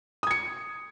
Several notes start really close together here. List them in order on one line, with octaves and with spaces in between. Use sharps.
D#6 G#6 C#7